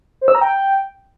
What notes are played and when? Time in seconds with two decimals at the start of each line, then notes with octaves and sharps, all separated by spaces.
0.21 C5
0.28 E6
0.35 A#5
0.41 G5